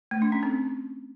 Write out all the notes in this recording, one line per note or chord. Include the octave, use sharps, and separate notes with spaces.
A3
D4
C#4
C4